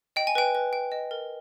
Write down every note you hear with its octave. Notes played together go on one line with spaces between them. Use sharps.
D#5 G5
G#5
B4 G5
B4
G5
D#5
A#4